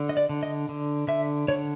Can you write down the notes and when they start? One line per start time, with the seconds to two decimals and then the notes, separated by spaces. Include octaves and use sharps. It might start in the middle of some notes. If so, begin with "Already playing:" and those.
Already playing: D3
0.09 D#5
0.17 D5
0.29 D3
0.43 D#5
0.69 D3
1.08 D3 E5
1.48 D3 C#5